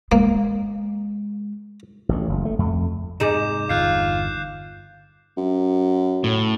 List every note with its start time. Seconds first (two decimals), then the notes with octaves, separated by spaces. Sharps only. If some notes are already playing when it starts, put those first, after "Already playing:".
0.12 G#3 A#3
2.09 A1 A2
2.29 F#1
2.45 A3
2.59 F2 A3
3.20 G#2 C3 D#4 G#4 D6 G6 E7
3.69 G1 E2 F4 F#6 G6 C7
5.37 F#2
6.24 A2